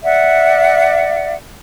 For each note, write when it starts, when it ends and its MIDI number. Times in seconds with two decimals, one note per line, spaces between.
0.04 1.34 74
0.04 1.34 76
0.04 1.34 78